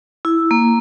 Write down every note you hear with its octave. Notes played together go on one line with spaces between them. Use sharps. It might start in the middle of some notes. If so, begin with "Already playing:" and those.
E4
A#3